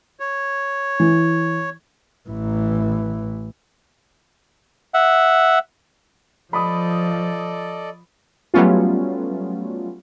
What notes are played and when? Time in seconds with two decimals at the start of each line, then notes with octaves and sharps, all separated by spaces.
0.20 C#5
1.00 E3
2.29 A1 E3
4.94 E5 F#5
6.53 F3 A4 D5 D#5 B5 D#6
8.54 F#3 G3 A3 B3 C#4 F4